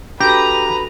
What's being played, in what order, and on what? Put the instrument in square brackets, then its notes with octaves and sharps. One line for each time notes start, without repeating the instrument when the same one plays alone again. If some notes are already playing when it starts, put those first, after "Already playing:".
[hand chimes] D4 F#4 A4 [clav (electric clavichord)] G4 [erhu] B4 [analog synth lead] A#5